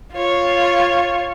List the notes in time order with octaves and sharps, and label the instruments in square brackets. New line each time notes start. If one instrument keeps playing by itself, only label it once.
[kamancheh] F4 C#5